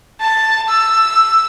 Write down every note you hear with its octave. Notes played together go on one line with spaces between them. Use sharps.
A5
E6